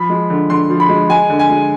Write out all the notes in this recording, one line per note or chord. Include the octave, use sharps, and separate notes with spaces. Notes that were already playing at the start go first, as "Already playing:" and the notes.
Already playing: F3 B5
G#3
D3
D3 C6
F3
B5
G#3
G#3 G#5
D3
G#5
G#3